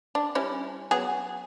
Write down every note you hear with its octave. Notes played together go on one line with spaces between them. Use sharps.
D4
G3 C#4 E4
F#3 B3 G#4